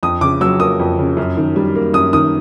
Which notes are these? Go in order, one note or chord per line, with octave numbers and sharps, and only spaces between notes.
F2 D#6
C#3 D6
F#3 E6
A#3 D#6
F2
C#3
F#2
D#3
G3
A#3
F#2 D#6
D#3 D#6